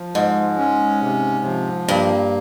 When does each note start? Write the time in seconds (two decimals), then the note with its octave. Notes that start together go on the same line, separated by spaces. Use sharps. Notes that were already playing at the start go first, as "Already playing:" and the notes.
Already playing: F3
0.15 G#2 G#3
0.58 C#4
1.02 C3
1.45 F3
1.88 G2 A#3